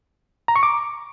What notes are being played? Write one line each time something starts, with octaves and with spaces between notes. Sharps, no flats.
A#5
C#6
D6